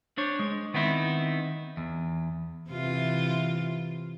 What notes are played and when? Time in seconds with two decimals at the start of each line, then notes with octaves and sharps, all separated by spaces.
0.18 D4 C5 C#5
0.39 G#3
0.74 D#3 B3 C4 D#4 E4
1.77 E2
2.69 C3 E3 F4